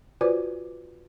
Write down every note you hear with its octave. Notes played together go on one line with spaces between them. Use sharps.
F4 F#4 B4 C5 D5 D6